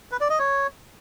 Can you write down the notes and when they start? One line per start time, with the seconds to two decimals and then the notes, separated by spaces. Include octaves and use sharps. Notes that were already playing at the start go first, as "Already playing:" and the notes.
0.11 B4
0.21 D5
0.30 D#5
0.39 C#5